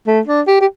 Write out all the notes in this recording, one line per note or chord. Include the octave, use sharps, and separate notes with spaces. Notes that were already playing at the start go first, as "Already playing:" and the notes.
A3
D4
G4
G4